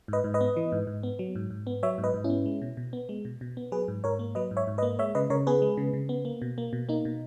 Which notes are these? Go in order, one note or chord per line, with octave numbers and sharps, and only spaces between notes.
G#2 B4 D#5
G#2
B4 D#5
B3
E3
G#2
G#2
B3
F#3
G#2
G#2
B3
F#3 C#5 E5
G#2
B4 D#5
G#2
C#4 E4
B3
G#3
B2
B2
B3
G#3
B2
B2
B3
F#3 G#4 B4
G#2
G#2 A#4 C#5
A#3
F#3 B4 D#5
G#2
C#5 E5
G#2
B4 D#5
A#3
G#3 C#5 E5
C#3 B4 D#5
C#3 A#4 C#5
B3 G#4 B4
G#3
C#3
C#3
B3
A#3
B2
A#3
B2
A#3 D#4
B2